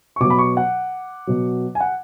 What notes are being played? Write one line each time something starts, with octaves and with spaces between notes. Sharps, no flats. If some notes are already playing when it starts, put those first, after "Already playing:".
C#6
B2 F#3 D6
B5
C#6
F#5
B2 F#3
G#5
F#5